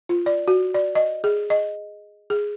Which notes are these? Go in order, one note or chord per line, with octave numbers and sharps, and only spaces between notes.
F4
D5
F#4
D5
D#5
G#4
D#5
G#4